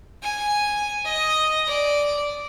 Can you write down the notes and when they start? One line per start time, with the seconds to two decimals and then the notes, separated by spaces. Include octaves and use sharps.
0.22 G#5
1.05 D#5
1.67 D5